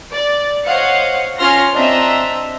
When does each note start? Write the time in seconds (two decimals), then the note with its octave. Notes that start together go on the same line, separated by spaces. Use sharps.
0.12 D5
0.66 C5 C#5 D#5 F5 F#5 C#7
1.37 C#4 F4 C6 F6 A#6
1.75 C4 D4 D#5 E5 A#5